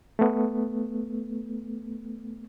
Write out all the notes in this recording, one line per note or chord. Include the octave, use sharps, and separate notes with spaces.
A3 B3